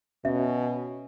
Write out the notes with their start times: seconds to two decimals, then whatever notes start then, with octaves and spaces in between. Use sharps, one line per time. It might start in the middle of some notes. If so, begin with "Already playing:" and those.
0.25 B2 C#4 E5